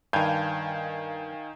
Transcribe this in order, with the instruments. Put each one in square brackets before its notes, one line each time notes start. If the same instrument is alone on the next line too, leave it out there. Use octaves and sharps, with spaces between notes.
[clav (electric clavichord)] G2 [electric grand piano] D#3 G6 [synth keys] F5 G#5 G#6